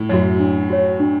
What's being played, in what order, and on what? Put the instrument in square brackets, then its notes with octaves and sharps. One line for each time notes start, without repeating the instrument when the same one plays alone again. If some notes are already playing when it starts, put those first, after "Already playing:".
Already playing: [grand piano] A2
[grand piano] F#2 [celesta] F#4 C#5
[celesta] D4
F#4 C#5
D4